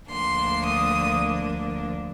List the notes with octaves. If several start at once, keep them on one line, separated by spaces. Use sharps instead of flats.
D2 D3 F3 A#3 D4 C6
D#6